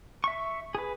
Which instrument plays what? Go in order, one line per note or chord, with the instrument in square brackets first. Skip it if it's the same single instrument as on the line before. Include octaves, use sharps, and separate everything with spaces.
[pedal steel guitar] E5 C#6
G#4 B4